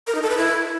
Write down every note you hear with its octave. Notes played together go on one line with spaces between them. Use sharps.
A#4
D#4
A4
B4
E4